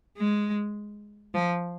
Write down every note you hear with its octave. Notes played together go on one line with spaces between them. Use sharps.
G#3
F3